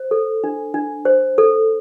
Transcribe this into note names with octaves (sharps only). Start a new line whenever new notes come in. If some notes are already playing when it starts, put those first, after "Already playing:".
Already playing: C5
A4
D4
D4
C5
A4